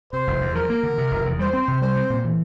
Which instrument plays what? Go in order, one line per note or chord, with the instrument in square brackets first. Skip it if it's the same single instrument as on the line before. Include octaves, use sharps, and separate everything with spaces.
[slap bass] C3 [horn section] C5
[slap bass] F1
E2
[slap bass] F3 [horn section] A#4
[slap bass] A#3
D3
C3
F1
E2
[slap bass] G3 [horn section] C5
[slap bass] C4
C3
[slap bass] G3 [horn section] C5
[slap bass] C4
A#2
E3